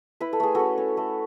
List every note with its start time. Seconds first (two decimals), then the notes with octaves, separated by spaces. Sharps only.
0.20 E4 B4
0.33 A4
0.40 A3 G#4
0.55 C#4 F#4 A4
0.78 C#4
0.97 A3